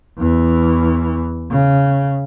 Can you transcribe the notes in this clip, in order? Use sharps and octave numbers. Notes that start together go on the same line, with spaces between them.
E2 E3
C#3